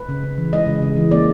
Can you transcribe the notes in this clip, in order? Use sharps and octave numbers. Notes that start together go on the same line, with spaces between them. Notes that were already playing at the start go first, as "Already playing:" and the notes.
Already playing: B4
C#3
C#3
E3
G#3 D#5
C#3
C#3
E3
A#3 D5